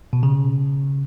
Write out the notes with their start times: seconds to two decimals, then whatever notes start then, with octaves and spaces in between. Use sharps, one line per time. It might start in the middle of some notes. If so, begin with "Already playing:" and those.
0.13 B2
0.23 C#3